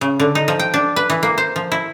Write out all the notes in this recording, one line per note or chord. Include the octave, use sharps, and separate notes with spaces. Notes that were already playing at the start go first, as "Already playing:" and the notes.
C#3
D3
D#4
F3
G5
D4
B4
E3
A#3
C5
F3
E4